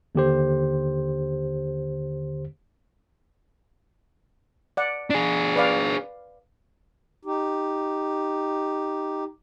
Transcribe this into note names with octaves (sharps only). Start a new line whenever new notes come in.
D#2 D3 G4 C5
D5 F#5
D4 G#4
B4 D5 F5
D#4 G4